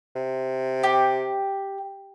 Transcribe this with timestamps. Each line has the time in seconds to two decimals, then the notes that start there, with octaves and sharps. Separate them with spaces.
0.16 C3
0.83 G4